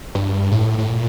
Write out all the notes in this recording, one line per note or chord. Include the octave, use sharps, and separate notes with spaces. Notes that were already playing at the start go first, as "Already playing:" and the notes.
G2
A2
A2
A#2